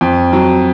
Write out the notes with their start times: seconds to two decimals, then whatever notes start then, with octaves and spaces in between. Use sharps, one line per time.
0.01 F2
0.33 F#3